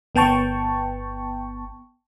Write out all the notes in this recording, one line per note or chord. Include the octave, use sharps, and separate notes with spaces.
G1 B3 G5 A5 C#6